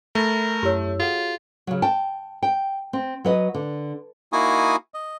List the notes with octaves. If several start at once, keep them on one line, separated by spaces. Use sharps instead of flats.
A3 A#4 B5 A6 A#6
F#2 E4 G4 C#5 E6
F4 F#4 G#4 A4 F#5
C#3 F#3
G5 A5
G5
C4
F#3 B4 D#5
D3
A#3 D#4 E4 F#4 G#5 D#6
D#5